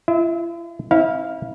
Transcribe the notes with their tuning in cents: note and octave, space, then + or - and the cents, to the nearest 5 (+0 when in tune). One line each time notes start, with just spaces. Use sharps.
E4 +45 E5 -30
C4 +25 E4 -35 F5 +0